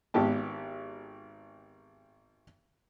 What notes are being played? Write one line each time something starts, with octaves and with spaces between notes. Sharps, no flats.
G#1 B3 G4 A5